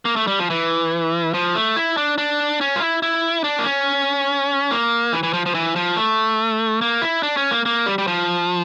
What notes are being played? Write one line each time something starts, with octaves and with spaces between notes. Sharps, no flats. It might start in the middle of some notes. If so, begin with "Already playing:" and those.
A#3
A3
G3
F3
E3
F3
A3
E4
D4
D4
C#4
F4
E4
E4
D4
A#3
C#4
A#3
E3
E3
F3
F3
E3
F3
A3
A#3
E4
D4
C#4
A#3
A#3
G3
G3
F3